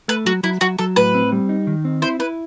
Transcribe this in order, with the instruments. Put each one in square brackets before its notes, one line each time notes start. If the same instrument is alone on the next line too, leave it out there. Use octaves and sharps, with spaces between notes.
[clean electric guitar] A3 [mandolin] B4
[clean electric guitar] F#3 [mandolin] F#4
[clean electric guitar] F#3 [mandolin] E4
[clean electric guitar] F#3 [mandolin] F#4
[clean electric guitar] F#3 [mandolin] A4
[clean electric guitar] A2 [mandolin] B4
[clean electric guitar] C4
G3
D#4
D#3
C4
[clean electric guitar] E4 [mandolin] C5
[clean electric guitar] E4 [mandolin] B4